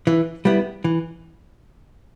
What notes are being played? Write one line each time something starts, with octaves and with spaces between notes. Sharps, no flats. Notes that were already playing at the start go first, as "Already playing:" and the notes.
E3
G3 B3 E4
E3